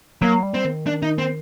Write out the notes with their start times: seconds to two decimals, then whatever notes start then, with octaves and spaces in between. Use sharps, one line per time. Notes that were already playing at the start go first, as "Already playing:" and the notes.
0.22 F#3 A#3
0.43 G3
0.54 C4
0.65 D#3
0.87 D4
1.02 D#4
1.18 C4